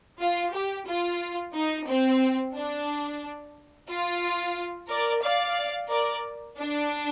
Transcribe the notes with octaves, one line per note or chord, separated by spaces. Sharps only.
F4
G4
F4
D#4
C4
D4
F4
A#4 D5
D5 F5
A#4 D5
D4